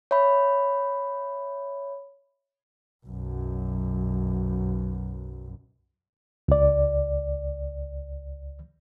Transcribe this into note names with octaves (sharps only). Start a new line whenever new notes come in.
C#5 E5 B5
B1 F#2
C#2 D5